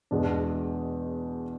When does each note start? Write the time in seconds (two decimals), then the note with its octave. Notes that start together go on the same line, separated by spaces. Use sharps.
0.11 E2 B2 G#3 D4